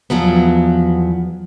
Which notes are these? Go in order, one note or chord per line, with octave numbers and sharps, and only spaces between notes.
E2 F3 F#3 B3